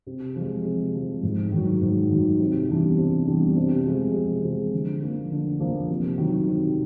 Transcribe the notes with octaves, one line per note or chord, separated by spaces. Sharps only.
C3
F3 G#3
C3
F3 G#3
G#2
D#3 F#3
G#2
D#3 F#3
C3
E3 G3 B3 D4
C3
E3 G3 B3 D4
C3
F3 G#3
C3
F3 G#3
D3
F3 A#3
D3
F3 A#3
C3
D#3 F#3
C3